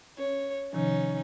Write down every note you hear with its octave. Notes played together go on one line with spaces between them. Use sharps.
C#4 C#5
C3 D#3 F3 C#4 D#4